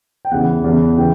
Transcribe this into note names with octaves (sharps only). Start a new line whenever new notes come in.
G5
E2 C#3 E3 F#5
E2 C#3 E3
C#3 E3 G5